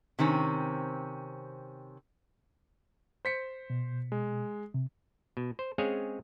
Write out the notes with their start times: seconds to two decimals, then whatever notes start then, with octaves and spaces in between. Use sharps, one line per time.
0.19 C3 D#3 C4 C#4
3.25 C5 B6 C#7
3.70 B2
4.12 G#3
4.74 C3
5.37 B2
5.59 C5
5.78 G#3 C4 C#4 G#4 C#5 F5